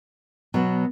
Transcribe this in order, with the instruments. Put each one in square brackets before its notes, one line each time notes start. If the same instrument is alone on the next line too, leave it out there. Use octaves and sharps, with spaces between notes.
[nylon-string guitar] B2 F#3 B3